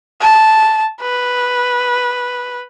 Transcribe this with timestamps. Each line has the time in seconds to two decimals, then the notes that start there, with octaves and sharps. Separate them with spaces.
0.21 A5
1.01 B4